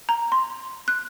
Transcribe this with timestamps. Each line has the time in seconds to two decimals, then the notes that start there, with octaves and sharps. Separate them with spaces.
0.09 A#5
0.32 C6
0.88 F#6